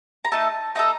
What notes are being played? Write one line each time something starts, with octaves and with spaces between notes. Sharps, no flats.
A#5
A3 D#4 A4 A5
A3 D#4 A4 A#5